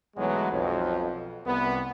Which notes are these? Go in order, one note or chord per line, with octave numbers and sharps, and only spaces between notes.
B1 E3 F#3 G#3 A3 B3
B1 F2
C2 B3